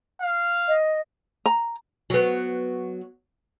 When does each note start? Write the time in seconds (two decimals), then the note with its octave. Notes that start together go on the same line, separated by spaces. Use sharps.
0.21 F5
0.68 D#5
1.46 A#5
2.10 F#3 B3